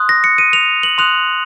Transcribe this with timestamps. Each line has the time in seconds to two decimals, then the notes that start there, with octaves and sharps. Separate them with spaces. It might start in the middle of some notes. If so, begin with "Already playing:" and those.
Already playing: C6 D#6 F#6
0.09 A#6
0.24 C#7
0.38 D#7
0.53 F7
0.83 F#7
0.98 C6 D#6 F#6 F7